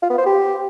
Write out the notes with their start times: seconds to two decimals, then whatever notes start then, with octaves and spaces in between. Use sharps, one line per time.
0.02 F4
0.10 B3
0.18 C5
0.26 G4